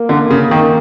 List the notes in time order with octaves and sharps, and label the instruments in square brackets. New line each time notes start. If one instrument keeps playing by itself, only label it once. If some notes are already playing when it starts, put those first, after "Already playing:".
Already playing: [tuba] A#3
[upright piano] D3
C#3
D#3